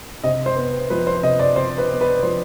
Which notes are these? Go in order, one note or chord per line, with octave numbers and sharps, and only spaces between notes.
C3 D#5
C5
B3
F3 B4
C5
C3 D#5
D5
C3 C5
B4
B3
B4
F3 C5